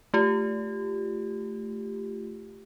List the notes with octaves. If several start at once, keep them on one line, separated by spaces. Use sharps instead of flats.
A3 F4 G4